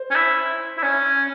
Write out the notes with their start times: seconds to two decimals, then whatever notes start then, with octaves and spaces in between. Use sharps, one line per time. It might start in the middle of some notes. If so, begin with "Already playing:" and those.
Already playing: C5
0.11 C#4
0.15 E4
0.77 E4
0.83 C#4